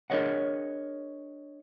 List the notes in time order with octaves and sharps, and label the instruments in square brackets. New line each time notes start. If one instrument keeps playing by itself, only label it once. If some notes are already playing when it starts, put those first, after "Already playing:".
[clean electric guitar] D4 G#4 A#4 C#5 D#5 F#5